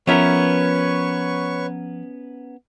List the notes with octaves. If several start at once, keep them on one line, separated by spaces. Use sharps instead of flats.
F3 B3 C#4 A#4 B4 C#5 E5 C#6